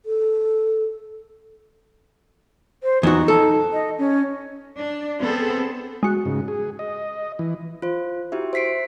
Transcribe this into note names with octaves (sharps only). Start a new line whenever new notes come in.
A4
C5
E2 D#4 F#4
A4
D#5
C#4
D4
B3 C4 G#4 A4
G#3 F#4
G#2 C#3
G#4
D#5
E3
F4 C5
E4 F#4 G4 E5
C5 E5 B6 C7 D7